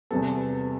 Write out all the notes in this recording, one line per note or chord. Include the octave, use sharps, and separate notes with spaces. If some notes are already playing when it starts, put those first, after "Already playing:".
E2 C3 G3 B3 A4